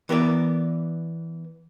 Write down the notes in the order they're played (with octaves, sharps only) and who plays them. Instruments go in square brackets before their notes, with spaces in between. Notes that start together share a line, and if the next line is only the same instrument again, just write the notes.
[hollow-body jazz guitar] E3 B3 A#4 D5